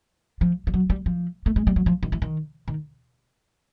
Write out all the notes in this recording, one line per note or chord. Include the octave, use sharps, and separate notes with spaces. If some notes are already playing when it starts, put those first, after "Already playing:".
F3
F3
F#3
G3
F3
A3
G#3
G3
F#3
F3
D#3
E3
D#3
D#3